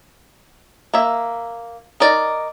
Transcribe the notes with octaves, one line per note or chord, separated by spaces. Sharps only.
A#3 E5
D#4 A#4 D5